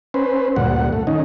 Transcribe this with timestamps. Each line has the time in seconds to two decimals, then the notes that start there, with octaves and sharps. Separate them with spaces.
0.14 C#4 B4 C5
0.56 D2 G2 A#2 F#5
0.93 A3
1.07 D#3 C#4 D#4